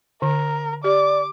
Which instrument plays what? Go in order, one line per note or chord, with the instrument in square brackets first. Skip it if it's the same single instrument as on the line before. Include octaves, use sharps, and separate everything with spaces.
[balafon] D3 [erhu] A#4
[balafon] G4 [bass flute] D5 [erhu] D6